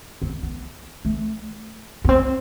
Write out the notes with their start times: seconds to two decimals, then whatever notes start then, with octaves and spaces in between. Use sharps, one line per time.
0.22 C4
0.42 B3
1.05 A3
2.05 B3
2.09 C4